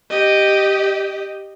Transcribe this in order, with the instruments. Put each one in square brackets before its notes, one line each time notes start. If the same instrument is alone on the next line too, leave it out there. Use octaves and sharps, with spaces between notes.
[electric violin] G4 D#5